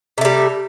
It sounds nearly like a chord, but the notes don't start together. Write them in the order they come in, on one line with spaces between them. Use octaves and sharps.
C3 A3 G3